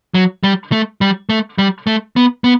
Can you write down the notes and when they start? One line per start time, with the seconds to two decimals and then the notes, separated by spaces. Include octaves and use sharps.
0.14 F#3
0.43 G3
0.72 A3
1.01 G3
1.29 A3
1.58 G3
1.87 A3
2.16 B3
2.44 B3